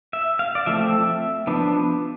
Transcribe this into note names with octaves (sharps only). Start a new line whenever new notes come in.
E5
F5
D5
F3 A3 C4 E5
F3 B3 D4